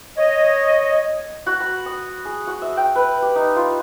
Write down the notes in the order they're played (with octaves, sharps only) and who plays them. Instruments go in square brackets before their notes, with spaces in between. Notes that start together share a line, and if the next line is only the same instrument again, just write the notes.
[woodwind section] C#5 D#5
[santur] F#4
B5
D#6
G#4
F#4
E5
G5
B4
G4
D#4
F4